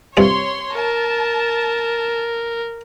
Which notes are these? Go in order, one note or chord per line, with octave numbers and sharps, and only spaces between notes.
G2 C3 F4 C#5 C6
A#4 A5